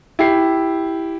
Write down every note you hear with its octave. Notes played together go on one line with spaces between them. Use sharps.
E4 G4 C7